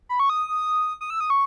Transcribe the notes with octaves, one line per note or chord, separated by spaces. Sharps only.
B5
C#6
D#6
D#6
E6
D#6
C#6